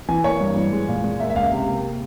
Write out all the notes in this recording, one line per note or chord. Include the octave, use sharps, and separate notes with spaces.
E3 G#5
A#3 C#5
G2
E3
G#3
A#2
G#3
A#3 E5
E5
C#2 F5
C3
A#3